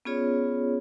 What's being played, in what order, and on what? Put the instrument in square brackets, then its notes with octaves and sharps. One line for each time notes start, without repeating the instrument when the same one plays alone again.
[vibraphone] B3 C#4 F4 G#4 C#5 D5